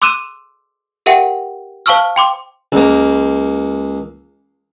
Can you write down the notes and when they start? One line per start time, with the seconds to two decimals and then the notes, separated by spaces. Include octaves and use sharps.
0.02 C6 D6 E6 F#6 D#7 E7
1.06 G4 A#4 E5 F#5 G5
1.86 C5 F5 A5 C#6 E6 F6
2.16 G5 C6 D6
2.72 C#2 A#3